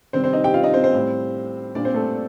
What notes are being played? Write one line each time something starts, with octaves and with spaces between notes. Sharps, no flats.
C3 D#3 G3 C4 C5
C4 C5
D#4 D#5
G4 G5
F4 F5
D#4 D#5
C4 C5
C4 C5
A2 G3
A#2 G3 D4 D5
C4 C5
A3 A4